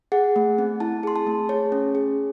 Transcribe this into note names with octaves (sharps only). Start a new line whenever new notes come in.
G#4 F#5
A3
C4
E4 A5
G#4 C6
A5
A3
G#4 C#5
C#4
G#4